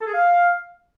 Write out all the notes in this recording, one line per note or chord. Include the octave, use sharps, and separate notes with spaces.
A4
G#4
F5